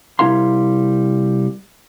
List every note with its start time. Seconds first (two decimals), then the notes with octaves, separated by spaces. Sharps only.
0.19 C3 G3 E4 A#4 F5 C6